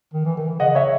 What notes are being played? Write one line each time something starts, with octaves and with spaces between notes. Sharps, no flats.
D#3
E3
D#3
E3
C#3 D#5 F#5
C#5 E5
C#3